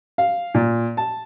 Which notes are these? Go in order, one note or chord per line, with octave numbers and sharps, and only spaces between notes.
F5
A#2
A5